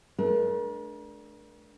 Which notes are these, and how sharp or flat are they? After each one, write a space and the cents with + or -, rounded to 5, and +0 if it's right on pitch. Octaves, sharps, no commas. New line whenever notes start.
A3 -35 D4 +0 A#4 +40